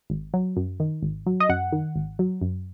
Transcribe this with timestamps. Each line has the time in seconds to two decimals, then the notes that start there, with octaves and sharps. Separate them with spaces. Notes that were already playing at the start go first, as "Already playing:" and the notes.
0.10 G#1
0.34 F#3
0.56 F#2
0.80 D#3
1.02 G#1
1.26 F#3
1.40 D#5
1.49 F#2 F#5
1.72 D#3
1.96 G#1
2.19 F#3
2.42 F#2